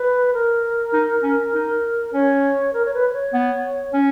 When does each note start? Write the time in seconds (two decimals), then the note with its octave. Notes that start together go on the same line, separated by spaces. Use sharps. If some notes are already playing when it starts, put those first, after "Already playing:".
Already playing: B4
0.34 A#4
0.93 D#4
1.23 C#4
1.54 D#4
2.14 C#4 C#5
2.73 A#4
2.85 C#5
2.94 B4
3.10 B4
3.13 C#5
3.33 B3
3.94 C#4